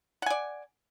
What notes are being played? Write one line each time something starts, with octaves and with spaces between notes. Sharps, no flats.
D5 F#5 G#5